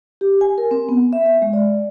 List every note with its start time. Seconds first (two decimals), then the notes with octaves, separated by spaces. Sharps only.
0.21 G4
0.41 G#5
0.58 A#4
0.71 C4
0.89 B3
1.13 E5
1.26 E5
1.42 G#3
1.53 D5